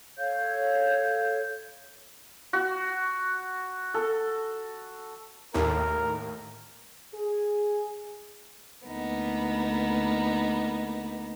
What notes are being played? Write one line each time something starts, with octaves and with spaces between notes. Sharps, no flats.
A4 C#5 F5 G6
F#4
A4
D#2 A2 A#4
G#4
D2 A#3 B3 D#4